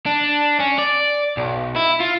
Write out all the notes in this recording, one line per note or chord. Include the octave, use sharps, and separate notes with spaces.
D4
C#4
D5
B1
E4
F4